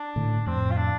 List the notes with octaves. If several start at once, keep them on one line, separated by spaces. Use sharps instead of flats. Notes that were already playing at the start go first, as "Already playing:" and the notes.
Already playing: D4
A2 D3
F2 A2 C4
F4
D4